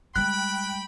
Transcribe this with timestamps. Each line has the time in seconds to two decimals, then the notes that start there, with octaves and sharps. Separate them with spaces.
0.16 G3 G#3 G5 B5 F#6